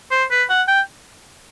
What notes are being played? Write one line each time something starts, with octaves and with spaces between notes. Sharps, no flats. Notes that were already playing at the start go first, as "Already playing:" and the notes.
C5
B4
F#5
G5